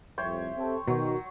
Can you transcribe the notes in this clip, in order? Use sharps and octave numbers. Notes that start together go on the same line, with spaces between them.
C2 F2 C5 C#5 E5 G5
C4 G4 A4
B2 D#3 F#3 F#4